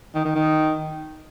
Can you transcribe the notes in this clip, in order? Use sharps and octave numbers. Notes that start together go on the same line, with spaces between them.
D#3
D#3
D#3